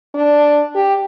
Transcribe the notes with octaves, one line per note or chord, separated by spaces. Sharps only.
D4
G4